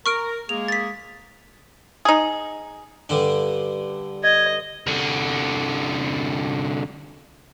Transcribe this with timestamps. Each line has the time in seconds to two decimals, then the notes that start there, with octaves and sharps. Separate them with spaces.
0.06 A#4 C#6 F6 D7
0.49 G#3 A#3 G#4 F7
0.68 A6 B6
2.05 D#4 G#4
3.09 G2 D3 D4
4.24 D#5 G#6
4.87 C2 D3